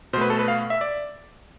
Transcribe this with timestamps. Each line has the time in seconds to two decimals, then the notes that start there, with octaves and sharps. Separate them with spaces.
0.13 B2 C5
0.17 A3 B4
0.30 A4
0.39 B4
0.48 F5
0.70 E5
0.81 D5